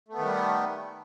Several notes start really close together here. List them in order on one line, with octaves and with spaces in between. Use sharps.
A3 B3 D#3 G3